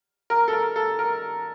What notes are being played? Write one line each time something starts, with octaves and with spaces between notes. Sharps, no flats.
A#4
A4
A#4
A4
A#4